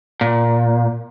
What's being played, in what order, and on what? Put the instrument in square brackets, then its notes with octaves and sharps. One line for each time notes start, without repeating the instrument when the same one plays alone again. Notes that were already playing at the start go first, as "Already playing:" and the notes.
[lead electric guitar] A#2